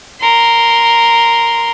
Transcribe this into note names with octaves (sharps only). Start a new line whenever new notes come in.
A#4 C6